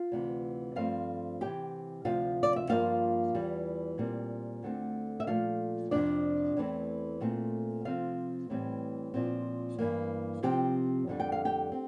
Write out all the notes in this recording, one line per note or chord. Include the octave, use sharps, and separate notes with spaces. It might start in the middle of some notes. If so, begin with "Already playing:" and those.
Already playing: F4 F5
D2 C3 E3
G2 F3 A3 C4 F4 F5
E2 C3 E3 G4 G5
D2 C3 F3 F4 F5
D5
E5
G2 F3 A#3 F4 F5
E2 E3 G3
A#2 G3 C4
D2 D3 A3 C4
E5
A#2 F3 A3 F4 F5
F2 C3 F3 D4 D5
E2 E3 A3 C4
A#2 A3 C4
C3 F3 C4 F4 F5
A2 E3 G3 C4
A#2 F3 C4
G2 E3 A#3
C3 F3 C4 G4 G5
F2 D3 G3
G5
F5
G4 G5
C4